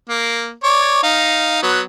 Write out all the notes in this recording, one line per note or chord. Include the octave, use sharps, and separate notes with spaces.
A#3
C#5 D5
D#4 F5
F#3 B3